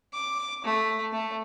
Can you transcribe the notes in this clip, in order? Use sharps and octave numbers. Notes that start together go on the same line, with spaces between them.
D6
A3
A3